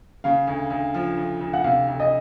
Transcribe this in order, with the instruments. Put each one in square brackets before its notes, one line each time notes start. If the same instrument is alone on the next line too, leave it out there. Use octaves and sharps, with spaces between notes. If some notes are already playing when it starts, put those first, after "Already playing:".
[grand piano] C#3 [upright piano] F5
[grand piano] D2
D2
F3
D2
D2
[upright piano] F#5
[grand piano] C3 [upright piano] F5
[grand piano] D2
[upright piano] D#5